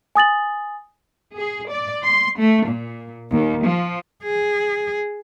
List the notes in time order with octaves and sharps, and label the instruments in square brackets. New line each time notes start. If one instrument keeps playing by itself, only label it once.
[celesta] G#5 D#6 A6 F#7
[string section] G#4
D5
C6
A3
A#2
D#2
F3
[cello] G#4